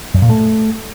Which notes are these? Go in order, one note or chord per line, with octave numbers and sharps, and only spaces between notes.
F#2
A#2
A3